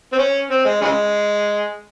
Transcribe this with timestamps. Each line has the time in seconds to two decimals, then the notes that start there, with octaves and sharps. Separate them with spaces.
0.13 C4
0.18 C#4
0.50 C4
0.65 G#3
0.81 C#3 G#3